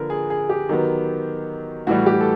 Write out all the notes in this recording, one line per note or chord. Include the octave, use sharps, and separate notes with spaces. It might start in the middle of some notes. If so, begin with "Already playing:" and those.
Already playing: D3 F3 A#3 A#4 B4
G#4
G#4
G4
D#3 F#3 B3
A2 E3 G3 F#4
G4
A4